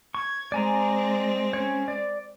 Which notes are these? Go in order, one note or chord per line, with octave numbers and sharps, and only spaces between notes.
C#6 G#6
G#3 C4 D5 G#5 A#5
C#4 C#5
D5